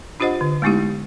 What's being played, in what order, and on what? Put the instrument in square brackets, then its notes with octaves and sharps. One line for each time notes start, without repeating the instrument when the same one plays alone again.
[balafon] D4 F4 G4 C5 D#5 F#5
D3
G#3 A3 B3 D#4 E4 G4